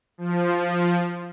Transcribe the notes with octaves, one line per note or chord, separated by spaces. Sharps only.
F3